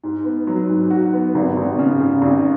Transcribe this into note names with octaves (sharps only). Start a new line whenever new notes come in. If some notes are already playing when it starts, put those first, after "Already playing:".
G#2
B3
F#3
G#2
F#4
B3
G#1
G#1
C#3
C#3
G#1